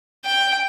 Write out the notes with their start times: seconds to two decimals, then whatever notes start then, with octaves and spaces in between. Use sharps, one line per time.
0.25 G5